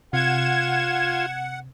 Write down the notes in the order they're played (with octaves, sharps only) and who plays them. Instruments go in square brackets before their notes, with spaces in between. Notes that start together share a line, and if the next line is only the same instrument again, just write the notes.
[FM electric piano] C3 [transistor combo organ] F4 [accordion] F#5 [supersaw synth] G#6 E7